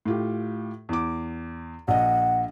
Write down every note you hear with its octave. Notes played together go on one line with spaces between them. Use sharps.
A2 F4 G4
E2 D6
A#1 D#5 F#5